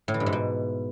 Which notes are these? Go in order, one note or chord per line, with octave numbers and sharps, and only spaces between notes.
A2
E3
G2
G#2
B2